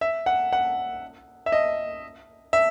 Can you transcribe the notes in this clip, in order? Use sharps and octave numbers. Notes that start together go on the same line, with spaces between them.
E5
F#5
F#5
E5
D#5
E5